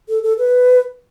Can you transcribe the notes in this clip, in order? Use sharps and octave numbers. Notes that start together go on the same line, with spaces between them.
A4
A4
B4